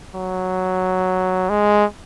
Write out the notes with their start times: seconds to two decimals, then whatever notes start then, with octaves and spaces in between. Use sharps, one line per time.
0.15 F#3
1.50 G#3